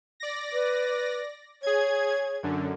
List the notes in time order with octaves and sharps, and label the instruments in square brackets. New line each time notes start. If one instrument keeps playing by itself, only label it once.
[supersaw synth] D5 A#6
[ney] B4
[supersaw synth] G#4 G#6 [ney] C#5
[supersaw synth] F#2 D3